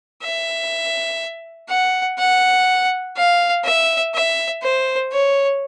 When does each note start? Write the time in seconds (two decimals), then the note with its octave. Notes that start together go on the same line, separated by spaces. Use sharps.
0.22 E5
1.69 F#5
2.18 F#5
3.17 F5
3.64 E5
4.14 E5
4.63 C5
5.12 C#5